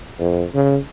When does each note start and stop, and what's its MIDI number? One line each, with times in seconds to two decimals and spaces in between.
0.20 0.44 41
0.55 0.77 49